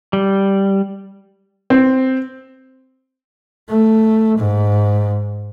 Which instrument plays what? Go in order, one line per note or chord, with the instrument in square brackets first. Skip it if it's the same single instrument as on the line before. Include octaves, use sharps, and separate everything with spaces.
[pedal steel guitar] G3
[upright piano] C4
[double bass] A3
G#2